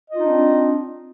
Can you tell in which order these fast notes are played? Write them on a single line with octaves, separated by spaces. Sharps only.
D#5 F4 D#4 D4 C4